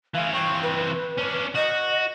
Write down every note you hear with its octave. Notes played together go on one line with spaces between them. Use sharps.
E3 C#4 F5
E3 C4 C#6
B4
C#4 D4
F#4 D#5